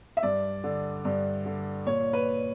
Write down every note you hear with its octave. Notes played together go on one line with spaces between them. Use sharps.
E5
G2 D5
D3
G2
D3
A#2 C#5
B4